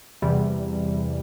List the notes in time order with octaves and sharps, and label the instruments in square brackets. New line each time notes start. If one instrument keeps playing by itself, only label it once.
[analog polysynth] E2 C3 E3 G3